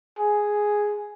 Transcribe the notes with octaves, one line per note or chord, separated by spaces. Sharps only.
G#4